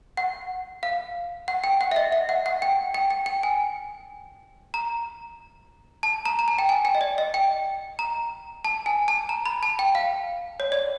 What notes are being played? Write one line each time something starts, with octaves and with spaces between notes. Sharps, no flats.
F#5
F5
F#5
G5
F#5
E5
D#5
E5
F#5
F#5
G5
G5
G5
G5
G#5
A#5
A5
A#5
A#5
A5
G5
G#5
G5
D#5
D5
D#5
G5
A#5
A5
G#5
A5
A#5
B5
A5
G5
F5
C#5
D5